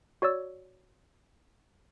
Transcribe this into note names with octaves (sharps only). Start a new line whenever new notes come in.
F#4 C#5 D5 E6